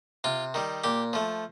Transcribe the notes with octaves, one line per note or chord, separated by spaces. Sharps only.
C3 F4
D#3 G3
A#2 G4
F3 A3